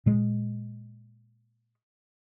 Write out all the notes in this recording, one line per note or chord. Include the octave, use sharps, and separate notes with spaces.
A#2 G#3